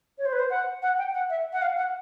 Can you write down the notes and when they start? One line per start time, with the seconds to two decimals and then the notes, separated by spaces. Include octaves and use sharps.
0.18 C#5
0.26 C5
0.33 B4
0.39 C5
0.50 F#5
0.82 F#5
0.98 G5
1.14 F#5
1.30 E5
1.53 F#5
1.62 F5
1.77 F#5